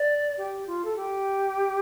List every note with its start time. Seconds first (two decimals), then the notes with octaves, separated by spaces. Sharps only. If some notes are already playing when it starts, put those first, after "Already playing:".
Already playing: D5
0.37 G4
0.67 F4
0.85 A4
0.96 G4